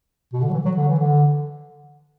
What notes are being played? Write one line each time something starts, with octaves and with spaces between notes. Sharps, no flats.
B2
D3
F#3
E3
F#3
D3
E3
D3